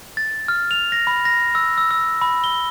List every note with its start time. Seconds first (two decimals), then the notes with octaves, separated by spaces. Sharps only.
0.17 A6
0.48 F6
0.71 F7
0.92 A#6
1.07 B5
1.25 A#6
1.55 E6
1.78 E6
1.91 E6
2.22 B5
2.44 G7